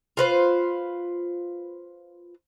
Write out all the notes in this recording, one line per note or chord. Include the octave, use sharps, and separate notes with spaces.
F4 B4 C5